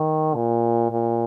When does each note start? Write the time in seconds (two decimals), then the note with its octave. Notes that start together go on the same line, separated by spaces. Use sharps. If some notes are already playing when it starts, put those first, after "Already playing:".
Already playing: D#3
0.35 A#2
0.91 A#2